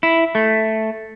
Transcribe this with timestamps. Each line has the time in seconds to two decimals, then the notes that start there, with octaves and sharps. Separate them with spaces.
0.03 E4
0.35 A3